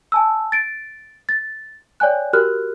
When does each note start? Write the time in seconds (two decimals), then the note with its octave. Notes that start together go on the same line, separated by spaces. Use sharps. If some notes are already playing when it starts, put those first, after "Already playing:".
0.12 G#5 A5 E6
0.52 A6 D7
1.29 A6
2.00 C#5 D5 G5 G#5 F#6
2.33 F#4 G4 A#4 F6 F#6